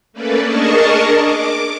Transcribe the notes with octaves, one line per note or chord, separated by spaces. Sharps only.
A3 A#3 C#4 B4 D5
D4 G#4 A#4 D#5 A5 C#6
D6